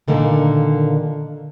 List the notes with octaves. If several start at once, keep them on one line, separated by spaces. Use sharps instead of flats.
A#2 D3 D#3 A#3